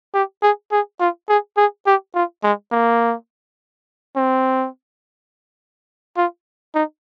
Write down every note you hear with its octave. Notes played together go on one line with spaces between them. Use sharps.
G4
G#4
G#4
F4
G#4
G#4
G4
F4
G#3
A#3
C4
F4
D#4